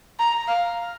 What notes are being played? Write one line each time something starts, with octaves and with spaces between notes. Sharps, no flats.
A#5
F5